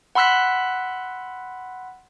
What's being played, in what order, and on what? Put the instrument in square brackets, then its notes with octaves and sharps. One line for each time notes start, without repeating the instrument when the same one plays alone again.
[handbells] F#5 B5 C6 E6 F#6 B6